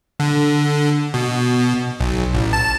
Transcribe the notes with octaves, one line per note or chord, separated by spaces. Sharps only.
D3
B2
B1
A1
A5